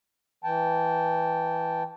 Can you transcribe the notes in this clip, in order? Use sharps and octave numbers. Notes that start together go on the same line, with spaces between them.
E3 G5 A5